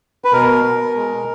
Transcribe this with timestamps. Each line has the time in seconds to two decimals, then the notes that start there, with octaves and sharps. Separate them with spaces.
0.25 B4
0.33 B2 A#4
0.64 B2
0.95 G#3